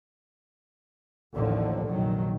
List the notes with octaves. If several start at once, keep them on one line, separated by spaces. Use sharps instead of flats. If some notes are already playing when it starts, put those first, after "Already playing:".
A1 D#2 D3 D#3 F3
F1 A#1 D#3 F#3